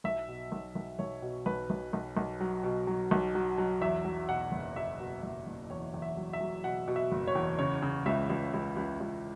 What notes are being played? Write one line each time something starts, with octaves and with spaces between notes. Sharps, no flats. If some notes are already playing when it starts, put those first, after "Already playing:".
B1 E5
B2
B1
B1
B1 C#5
B2
B1 B4
B1
B1
B1
F#3
B2
F#3
B1
F#3
F#3
E2 E5
F#3
B2 F#5
F#1
B2 E5
B2
F#1 E5
F#1
E2 C#5
E2
E5
F#3
E5
F#3
B2 F#5
B2
E5
F#1
C#5
E2
C#3 C#5
C#3
C#2 E5
C#2
C#2
C#2
C#2